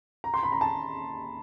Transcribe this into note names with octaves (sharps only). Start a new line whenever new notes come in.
A#5
C6
B5
A#5
A5